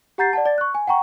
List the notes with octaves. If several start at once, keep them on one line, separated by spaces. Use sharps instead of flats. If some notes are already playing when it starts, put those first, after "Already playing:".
G4 F#5 A#5 G6 A6 C7
D5 F#5 A5
D5 A6
C#6 F#6
G#5
F#5 G5 A#5 C#6